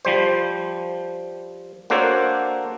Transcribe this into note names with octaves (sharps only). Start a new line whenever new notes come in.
F3 G3 C5
A#3 D4 F#4 A4 C5 C#5